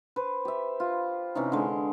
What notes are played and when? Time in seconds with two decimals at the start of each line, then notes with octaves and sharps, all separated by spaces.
0.16 B4 C5
0.45 G4 E5
0.80 F4
1.35 C3 E3 C#4 D#4
1.52 D3 G#3